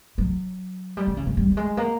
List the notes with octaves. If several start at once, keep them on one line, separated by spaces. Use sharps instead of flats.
F#3
G3
D3
C#3
D3
G3
G3
G#3
A#3